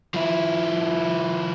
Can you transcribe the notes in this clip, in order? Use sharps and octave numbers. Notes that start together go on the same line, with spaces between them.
F3 E4